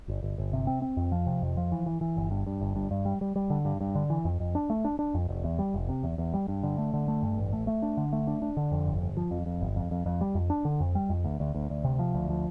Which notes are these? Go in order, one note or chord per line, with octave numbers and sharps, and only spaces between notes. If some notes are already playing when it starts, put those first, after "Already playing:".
G1
G1
G1
C3
C4
C4
F2
F3
C3
F2
F3
E3
E3
E3
G1
G2
G2
G1
G2
G2
G3
G3
G3
D3
G2
G2
D3
E3
F2
F2
D4
A3
D4
D4
F2
F1
E2
G3
F1
C3
E2
E2
G3
G2
D3
A3
D3
A3
G2
A1
A3
A3
D4
D3
A3
D4
D4
D3
F2
G1
G1
F3
F2
F2
G1
F2
F2
F2
G3
F2
D4
D3
F2
G3
F2
D2
D2
D2
D2
C3
F3
D2
F3